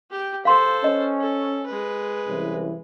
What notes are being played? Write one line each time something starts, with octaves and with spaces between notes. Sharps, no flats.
G4 G5
A4 C5 F5 C6
C#4 D#5
A4
G#3 B4
C2 E3 C#4